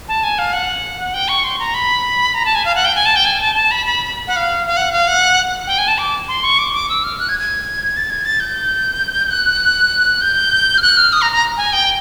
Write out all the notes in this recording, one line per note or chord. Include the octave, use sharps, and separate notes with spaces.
A5
G#5
F5
F#5
G5
C#6
C6
A#5
B5
A#5
A5
G#5
F5
F#5
G5
G#5
A5
G5
G#5
A5
A5
B5
B5
F#5
F5
F5
F#5
F5
F#5
G5
G#5
A5
D6
C6
C#6
D6
D6
E6
F6
F#6
G#6
G#6
A6
G#6
A6
G6
F#6
G6
F6
F#6
F6
D#6
A#5
A#5
G#5
G5